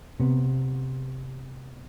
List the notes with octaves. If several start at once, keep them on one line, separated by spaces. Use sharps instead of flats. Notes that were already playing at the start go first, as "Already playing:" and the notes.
C3 B3